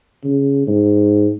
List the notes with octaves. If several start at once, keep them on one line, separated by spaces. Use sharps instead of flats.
C#3
G#2